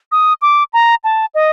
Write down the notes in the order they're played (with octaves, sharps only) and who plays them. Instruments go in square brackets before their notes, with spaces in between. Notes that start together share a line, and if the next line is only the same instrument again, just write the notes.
[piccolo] D#6
D6
A#5
A5
D#5